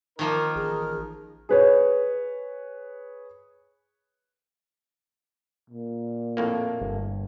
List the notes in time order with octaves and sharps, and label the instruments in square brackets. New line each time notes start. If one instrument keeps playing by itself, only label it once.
[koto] D#3 F3 A#3 [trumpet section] D#4 A#4
[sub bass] A1 [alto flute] G#4
[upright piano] G#4 B4 C#5
[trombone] A#2
[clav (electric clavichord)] F2 A2 A#3
[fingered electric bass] G1